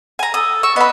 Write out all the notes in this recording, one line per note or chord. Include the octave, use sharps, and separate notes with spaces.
G#5 A#5
A4 D#6
C#6 E6
B3 D#5 B5